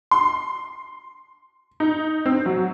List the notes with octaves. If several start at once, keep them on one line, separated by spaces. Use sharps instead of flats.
C6
D#4
C4
F#3